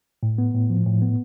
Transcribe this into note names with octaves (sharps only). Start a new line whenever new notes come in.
A2
B3
A2
F3
A2
B3